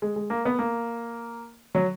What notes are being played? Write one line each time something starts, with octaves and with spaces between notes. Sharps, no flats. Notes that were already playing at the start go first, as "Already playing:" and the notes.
G#3
G#3
A#3
B3
A#3
F#3